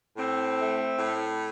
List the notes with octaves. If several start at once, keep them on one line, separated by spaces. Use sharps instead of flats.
A2 C4
A3
A2